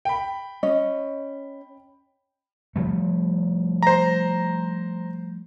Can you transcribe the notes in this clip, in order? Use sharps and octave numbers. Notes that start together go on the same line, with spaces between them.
G5 B5
C#4 D#5
F3 G3 A3
C5 A#5